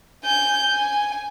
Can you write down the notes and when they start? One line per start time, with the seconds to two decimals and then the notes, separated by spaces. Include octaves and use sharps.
0.25 G#5 G6
0.69 G#5